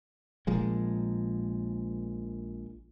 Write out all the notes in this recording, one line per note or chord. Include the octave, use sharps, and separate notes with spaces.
A#1 A#2 F3 G#3